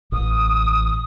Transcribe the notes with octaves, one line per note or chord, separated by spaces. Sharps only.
A1 D#6